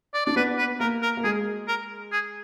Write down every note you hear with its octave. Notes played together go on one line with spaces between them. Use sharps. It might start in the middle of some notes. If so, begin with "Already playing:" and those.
D5
D4 D5
B3 B4
B4
A#3 A#4
A#4
A#3
G#3 G#4
A#4
G#4